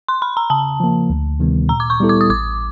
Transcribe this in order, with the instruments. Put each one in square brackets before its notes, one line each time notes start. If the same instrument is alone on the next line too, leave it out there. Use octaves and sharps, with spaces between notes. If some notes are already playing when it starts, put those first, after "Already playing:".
[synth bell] C6
B5
A#5
[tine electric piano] C#3 [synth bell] A5
[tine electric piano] F3 A#3
D2
C3 D#3 G3 B3
[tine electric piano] A#2 [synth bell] A#5
[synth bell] D6
C#6
[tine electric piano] G3 B3 E4 A4
[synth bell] D6
D#6
[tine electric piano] A1 [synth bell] D6